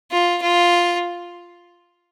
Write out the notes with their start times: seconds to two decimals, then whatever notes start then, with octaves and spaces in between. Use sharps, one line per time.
0.11 F4
0.42 F4